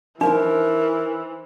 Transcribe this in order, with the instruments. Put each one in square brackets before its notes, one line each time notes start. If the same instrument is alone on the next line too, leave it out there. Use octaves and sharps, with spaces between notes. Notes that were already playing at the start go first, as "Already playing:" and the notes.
[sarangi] E3 [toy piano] D4 [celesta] D#4 C5 C6 [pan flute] A#4